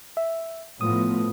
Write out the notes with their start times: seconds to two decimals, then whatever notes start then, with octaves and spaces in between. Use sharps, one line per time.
0.17 E5
0.81 A2 F3 B3 D#6